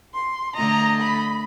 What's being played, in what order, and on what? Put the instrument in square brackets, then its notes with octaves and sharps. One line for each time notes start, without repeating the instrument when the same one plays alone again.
[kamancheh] C6
[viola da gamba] D3 A3 D#5 [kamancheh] A#5
[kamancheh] B5